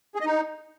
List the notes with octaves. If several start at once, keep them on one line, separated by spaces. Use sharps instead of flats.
G#4
D#5
D#4